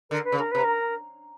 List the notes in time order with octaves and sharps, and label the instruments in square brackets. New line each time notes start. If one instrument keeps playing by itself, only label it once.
[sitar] D3 [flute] A#4
[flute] B4
[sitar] C#3
[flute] A#4
[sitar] C3 [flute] B4
[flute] A#4